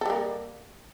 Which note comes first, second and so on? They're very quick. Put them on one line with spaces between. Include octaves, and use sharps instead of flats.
A4 G3 A#3